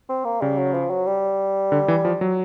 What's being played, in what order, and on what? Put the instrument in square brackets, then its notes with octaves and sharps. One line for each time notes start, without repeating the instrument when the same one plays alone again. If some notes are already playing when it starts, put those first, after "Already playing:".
[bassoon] C4
A#3
[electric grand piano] C#3 [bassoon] G3
[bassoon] F#3
F3
F#3
G3
[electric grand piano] D3
E3
F3
F#3